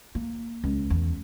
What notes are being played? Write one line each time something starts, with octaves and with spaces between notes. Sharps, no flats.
A#3
C#2
E2